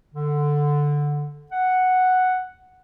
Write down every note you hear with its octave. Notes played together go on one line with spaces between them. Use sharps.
D3
F#5